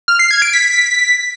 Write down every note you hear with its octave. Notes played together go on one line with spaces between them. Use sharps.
F6
C7
G#6
D7
B6